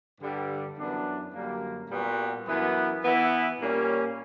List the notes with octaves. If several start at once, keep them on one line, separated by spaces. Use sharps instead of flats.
G2 D3 G3
F#2 E3 B3 D4
F#2 D3 G3 A#3
A#2 G3 B3 F#4
F#2 E3 B3
E3 B3 E4
A#2 G3 A#3 C#4